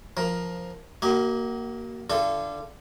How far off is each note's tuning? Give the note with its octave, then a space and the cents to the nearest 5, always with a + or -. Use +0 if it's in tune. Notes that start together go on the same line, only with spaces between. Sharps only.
F3 +0 A#4 +10
A#3 +0 F#4 +35 D#5 +40
D3 +0 F4 -35 A4 -15